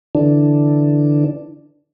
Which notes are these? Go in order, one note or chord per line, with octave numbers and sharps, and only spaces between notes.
D3 E3 D4